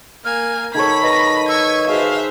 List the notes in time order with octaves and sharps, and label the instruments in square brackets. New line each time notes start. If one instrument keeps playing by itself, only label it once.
[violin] A#3 G#5 [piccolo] F6
[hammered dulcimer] D#3 A4 C#5 [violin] B5 B6 [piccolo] G#6
[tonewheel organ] B4 D#5 [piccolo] A#6
[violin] C#6 G#6 [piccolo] E6
[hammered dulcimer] F#4 G#4 [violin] C5 E5 [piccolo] F5